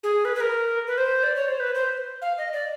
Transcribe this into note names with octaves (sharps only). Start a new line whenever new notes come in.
G#4
B4
B4
A#4
B4
C5
D5
C#5
C5
B4
C5
F5
D#5
D5